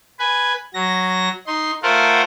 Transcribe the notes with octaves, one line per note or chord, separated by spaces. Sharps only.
B4 G#5
F#3 A#6
D#4 C6
A3 F4 A#4 C5 F#5